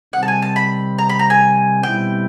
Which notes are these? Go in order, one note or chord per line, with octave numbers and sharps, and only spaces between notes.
C3 D#3 G3 C4 F#5
A5
G#5
A5
B5
A#5
B5
A#5
G#5
B2 G3 C4 E4 G5